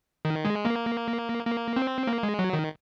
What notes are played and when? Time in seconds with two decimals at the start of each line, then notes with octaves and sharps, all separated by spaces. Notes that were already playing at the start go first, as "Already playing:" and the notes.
0.25 D#3
0.45 G#3
0.65 A#3
1.46 A#3
1.76 C4
2.07 A#3
2.23 G#3
2.39 F#3
2.53 D#3